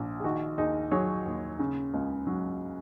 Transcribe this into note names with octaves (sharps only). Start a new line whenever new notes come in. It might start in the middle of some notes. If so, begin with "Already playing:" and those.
Already playing: A#1
G#4
D#3 F#4
D#2 D#4 G#4
F#3 G#4 C#5
D#2
C#3
C#2
F#3